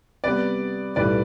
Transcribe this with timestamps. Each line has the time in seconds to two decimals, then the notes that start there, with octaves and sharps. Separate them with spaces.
0.24 C3 G3 B3 B4 D5
0.96 B1 A2 G3 B4 D5